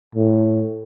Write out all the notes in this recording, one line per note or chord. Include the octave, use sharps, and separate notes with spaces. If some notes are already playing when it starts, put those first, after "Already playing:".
A2